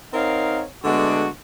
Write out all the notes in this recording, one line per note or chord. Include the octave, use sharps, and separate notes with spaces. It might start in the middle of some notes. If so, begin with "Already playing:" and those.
C4 D#4 A#4 C#5 F5 F#5
D3 G#3 A3 B3 D4 F#4